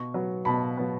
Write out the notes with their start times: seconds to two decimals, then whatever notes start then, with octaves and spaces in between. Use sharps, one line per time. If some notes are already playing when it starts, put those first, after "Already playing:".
Already playing: B2 C#6
0.14 F#3 B3
0.45 B2 A5 B5
0.77 F#3 B3